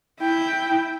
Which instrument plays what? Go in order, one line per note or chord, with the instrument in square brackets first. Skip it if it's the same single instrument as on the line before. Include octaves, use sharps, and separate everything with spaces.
[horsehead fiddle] E4 G5